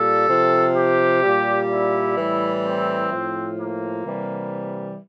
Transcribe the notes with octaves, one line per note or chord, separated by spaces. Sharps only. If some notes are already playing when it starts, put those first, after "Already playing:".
Already playing: A#2 G3 A4
C3 F3
G4
A#2 G3
E4
A2 E3 G3
C4
A2 F3
A#3
C3 E3 G3